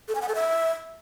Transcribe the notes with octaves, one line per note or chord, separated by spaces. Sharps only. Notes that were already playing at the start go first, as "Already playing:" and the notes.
A4
G#5
F#5
A4
E5